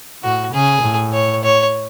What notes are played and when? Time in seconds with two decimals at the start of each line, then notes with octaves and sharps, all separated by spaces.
0.23 A2 F#4
0.53 C#3 G#4
0.82 A2
1.13 C#5
1.43 C#5